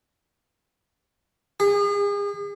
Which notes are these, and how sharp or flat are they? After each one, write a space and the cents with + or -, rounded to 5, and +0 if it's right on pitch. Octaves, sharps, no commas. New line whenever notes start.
G#4 -40